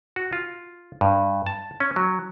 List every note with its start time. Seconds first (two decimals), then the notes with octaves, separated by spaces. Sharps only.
0.16 F#4
0.33 F4
1.01 G2
1.46 A5
1.80 C#4
1.96 F#3